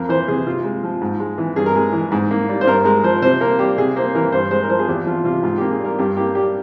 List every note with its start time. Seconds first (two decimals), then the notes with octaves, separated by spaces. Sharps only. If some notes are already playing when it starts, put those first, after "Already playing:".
Already playing: F2 A#4
0.09 E3 C5
0.28 C3 G#4
0.47 C3 F4
0.64 G#3
0.83 F3
1.01 G#2
1.20 G#3
1.38 E3
1.56 G2 G#4
1.66 A#4
1.76 G#3 G#4
1.93 E3
2.12 G#2
2.31 A#3
2.49 G3
2.61 C5
2.67 G2 A#4
2.85 G#3 A#4
3.03 F3 C5
3.22 C3 C5
3.41 A#3 A#4
3.59 G3 G4
3.78 C3 G#4
3.96 A#3 C5
4.15 E3 A#4
4.32 G2 C5
4.51 G#3 C5
4.63 A#4
4.69 F3 C5
4.79 G#4
4.87 E2 G4
5.06 F3 F4
5.24 C3 F4
5.43 G#2 F4
5.58 A#3 G4
5.71 G#4
5.80 G3 A#4
5.99 G2 G4
6.17 A#3 G4
6.35 G3 G4